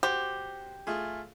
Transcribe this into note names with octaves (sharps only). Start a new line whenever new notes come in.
F#4 G4 C5
A3 F4 G#4